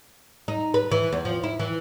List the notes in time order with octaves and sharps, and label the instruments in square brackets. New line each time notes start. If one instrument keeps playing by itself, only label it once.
[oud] D#4
B4
E3
E2
F3
E4
E3